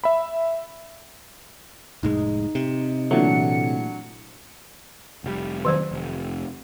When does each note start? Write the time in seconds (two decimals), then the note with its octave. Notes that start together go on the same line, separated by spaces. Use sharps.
0.04 E5 B5
2.03 F1 A2 G#3 D#4
2.55 C3
3.11 A#2 E3 F#3 A3 D4 C#7
5.24 F1 A#2 G3
5.65 D#3 F#3 C5
5.91 F1